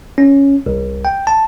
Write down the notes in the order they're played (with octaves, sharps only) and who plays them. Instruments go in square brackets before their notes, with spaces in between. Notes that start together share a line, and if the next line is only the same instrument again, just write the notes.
[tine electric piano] C#4
C2
G5
A5